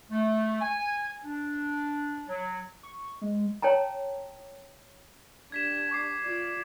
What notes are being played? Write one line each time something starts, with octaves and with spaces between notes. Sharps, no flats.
A3
G#5
D4
F#3
C#6
G#3
C#5 G5 A5 A#5
D4 G4 G#6 B6 E7
C#6 D6 C7
F4 D5